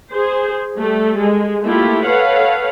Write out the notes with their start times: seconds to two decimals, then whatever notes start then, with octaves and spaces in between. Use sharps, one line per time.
0.12 G#4 C5
0.77 G3 A3 A4
1.20 G#3
1.65 A3 A#3 E4 F4 G4
2.05 A4 B4 C#5 F5 F#5